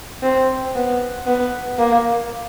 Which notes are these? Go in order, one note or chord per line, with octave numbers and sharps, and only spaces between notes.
C4
B3
B3
A#3